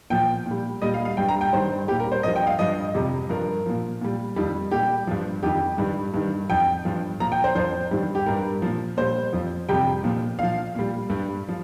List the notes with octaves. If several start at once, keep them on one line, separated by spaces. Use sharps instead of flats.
A#2 F3 G5
A#2
G3
A#2 G3 D#5
F5
F5
G2 G3 G5
A#5
G5
G2 D#3 G3 C5
A#2 G3 G4
A#4
C5
G2 F3 D#5
G5
F5
G2 F3 D#5
F2 C3 G3
G2 F3 A#4
A#2 F3
A#2 G3
F2 D#3 G3
A#2 G3 G4
G2 F3
F2 D#3 G3 G4
G2 D#3 G3
G2 D#3 G3
F2 F3 G5
G2 F3
A#2 F3 A#5
G5
C5
F2 F3 C5
G2 D#3 G3
G4
G2 G3 A#4
A#2 F3
A#2 G3 C5
F2 F3
F2 C3 G3 G5
A#2 F3
A#2 F3 F5
A#2 G3
G2 G3
F3